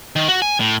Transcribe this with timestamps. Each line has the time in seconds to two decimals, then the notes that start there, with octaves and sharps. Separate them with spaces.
0.16 D#3
0.28 F#4
0.42 G#5
0.60 A2